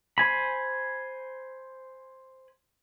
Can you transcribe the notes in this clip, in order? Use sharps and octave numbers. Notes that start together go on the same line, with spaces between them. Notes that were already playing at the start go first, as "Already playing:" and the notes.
C5 G#5 B5